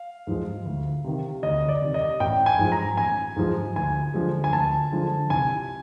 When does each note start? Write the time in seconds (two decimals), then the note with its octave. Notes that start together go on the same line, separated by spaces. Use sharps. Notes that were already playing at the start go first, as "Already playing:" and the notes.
Already playing: F5
0.27 G#2 F3 G#3
0.65 D2
1.04 C3 D#3
1.43 D2 D#5
1.69 D5
1.82 C3 D#3
1.94 D#5
2.20 A1 G5
2.46 G#5
2.59 G#2 F3 G#3
2.72 A#5
2.97 A1 G#5
3.36 G#2 F3 G#3
3.76 D2 G#5
4.14 D3 F3 G#3
4.44 G#5
4.53 D2 A5
4.92 D3 F3 G#3
5.30 C2 G#5